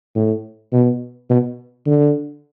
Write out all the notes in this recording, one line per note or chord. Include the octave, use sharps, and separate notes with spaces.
A2
B2
B2
D3